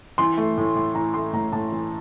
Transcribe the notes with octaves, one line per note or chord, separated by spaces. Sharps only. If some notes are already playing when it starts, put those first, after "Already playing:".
E3 C6
A3
A2
A2
E3 A#5
A3 C6
A2 A#5
A2 A5
E3